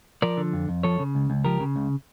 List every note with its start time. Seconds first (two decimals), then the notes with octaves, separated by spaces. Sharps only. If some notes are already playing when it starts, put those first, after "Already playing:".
0.22 F3 A#4 D5
0.37 D3
0.53 F2
0.69 F2
0.83 F3 A4 C#5
0.99 C#3
1.15 C#2
1.30 C#2
1.45 F3 G4 A#4
1.60 C#3
1.76 C#2